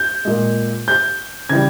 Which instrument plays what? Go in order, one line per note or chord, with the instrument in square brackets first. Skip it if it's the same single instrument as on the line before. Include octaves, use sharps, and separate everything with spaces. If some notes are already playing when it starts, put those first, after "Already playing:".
Already playing: [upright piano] G6
A#2 G#3
G6
C#3 E3 G3 G#6